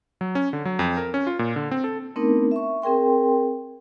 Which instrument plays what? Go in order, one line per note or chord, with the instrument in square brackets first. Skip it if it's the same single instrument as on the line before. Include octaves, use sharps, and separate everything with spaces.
[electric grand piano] F#3
C#4
D3
F#3
F2
A#4
C#4
F4
A#2
D3
C4
A4
[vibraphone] A3 B3 C4 D4 D#4 A#4
E5 C#6
C4 G#4 A#4 G5 C6